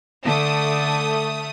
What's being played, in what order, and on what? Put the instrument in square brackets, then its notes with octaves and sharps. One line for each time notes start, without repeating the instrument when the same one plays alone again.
[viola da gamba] D3 [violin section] A3 D#6